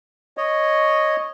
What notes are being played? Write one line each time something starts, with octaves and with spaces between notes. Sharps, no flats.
C#5 D#5